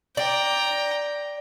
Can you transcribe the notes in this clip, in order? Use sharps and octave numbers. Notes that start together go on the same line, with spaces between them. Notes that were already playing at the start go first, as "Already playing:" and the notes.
D5 G5 A#5